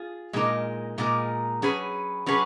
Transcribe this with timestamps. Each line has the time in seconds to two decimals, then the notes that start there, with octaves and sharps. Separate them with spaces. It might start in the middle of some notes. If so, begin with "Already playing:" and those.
Already playing: F4 G#4
0.33 A#2 G#3 D#4 A#4
0.98 A#2 G#3 D#4 A#4
1.62 F#3 C#4 G#4 B4
2.26 F#3 C#4 G#4 B4